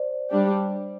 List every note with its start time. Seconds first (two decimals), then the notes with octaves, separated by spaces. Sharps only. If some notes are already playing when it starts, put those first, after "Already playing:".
Already playing: C5 D5
0.30 G3 D4 G4